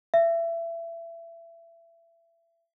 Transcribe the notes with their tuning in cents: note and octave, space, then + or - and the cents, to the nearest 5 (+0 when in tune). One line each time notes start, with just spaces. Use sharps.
E5 +25